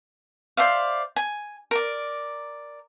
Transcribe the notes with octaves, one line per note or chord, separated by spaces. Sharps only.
C5 D5 E5 F5
G#5
A#4 D5